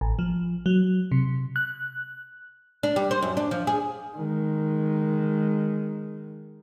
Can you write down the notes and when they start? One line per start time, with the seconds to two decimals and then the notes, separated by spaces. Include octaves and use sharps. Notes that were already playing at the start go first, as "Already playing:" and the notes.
0.01 A1
0.19 F3
0.66 F#3
1.12 C3
1.56 F#6
2.83 D4
2.96 G3
3.11 C5
3.22 F#2
3.37 D4
3.51 F3
3.67 G#4
4.15 D#3 G#3